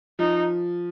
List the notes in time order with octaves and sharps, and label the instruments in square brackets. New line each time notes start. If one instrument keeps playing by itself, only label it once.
[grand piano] F3 [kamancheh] D#4